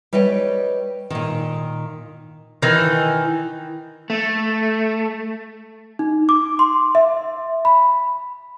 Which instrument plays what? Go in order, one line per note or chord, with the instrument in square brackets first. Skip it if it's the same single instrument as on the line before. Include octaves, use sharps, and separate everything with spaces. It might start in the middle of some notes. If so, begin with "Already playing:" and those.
[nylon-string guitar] G3 B4 C#5 D#5 G5
A#2 D#3
[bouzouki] D#3 E3
[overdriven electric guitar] A3
[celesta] D#4
D6
C6
E5
B5